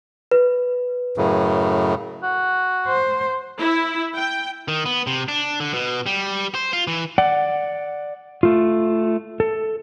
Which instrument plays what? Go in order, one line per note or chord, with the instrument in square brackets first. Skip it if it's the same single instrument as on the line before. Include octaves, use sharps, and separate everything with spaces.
[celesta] B4
[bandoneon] F#2 A2 C#3
[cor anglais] F#4
[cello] C5
[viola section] E4
G5
[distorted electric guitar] D#3
B3
C3
D4
D3
B2
G3
C5
F4
E3
[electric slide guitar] D5 F#5
A3 F4
A4